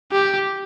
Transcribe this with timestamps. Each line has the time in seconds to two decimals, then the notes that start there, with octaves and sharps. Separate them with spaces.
0.12 G4